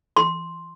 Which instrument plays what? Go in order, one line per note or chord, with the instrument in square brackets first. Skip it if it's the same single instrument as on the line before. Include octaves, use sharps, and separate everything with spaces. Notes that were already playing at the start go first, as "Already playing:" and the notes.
[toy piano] C6